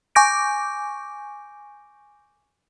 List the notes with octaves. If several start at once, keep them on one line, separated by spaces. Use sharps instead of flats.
G#5 C#6 D6 G6 A#6 D7